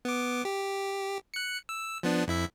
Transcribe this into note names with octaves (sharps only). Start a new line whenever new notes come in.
B3 D6
G4
F#6 C#7
E6
F3 B3 D4
F2 E4 E5